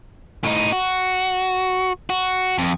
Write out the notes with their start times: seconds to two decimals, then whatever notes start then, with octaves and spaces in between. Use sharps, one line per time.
0.44 A2 D#4
0.73 F#4
2.10 F#4
2.58 F2